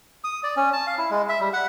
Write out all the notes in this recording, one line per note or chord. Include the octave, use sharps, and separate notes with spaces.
D#6
D5
C#4
A5
F5
E4
G#3
E5
G3
F#5